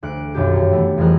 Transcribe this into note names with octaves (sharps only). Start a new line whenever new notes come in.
D2 F#6 D7
B1 F#2 D#3 G4
G2 A#4
E3 A3 B3
F2 E3 G3 G#4 A#4 F#6